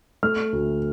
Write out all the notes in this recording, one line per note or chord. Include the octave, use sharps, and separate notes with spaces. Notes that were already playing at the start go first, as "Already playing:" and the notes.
A3 F6
D2